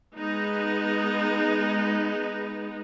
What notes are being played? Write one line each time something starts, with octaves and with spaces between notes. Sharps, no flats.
G#3 B3 D#4